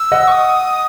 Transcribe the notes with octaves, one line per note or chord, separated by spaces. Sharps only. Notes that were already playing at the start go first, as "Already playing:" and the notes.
Already playing: E6
D#5 F#5
C#6
D#6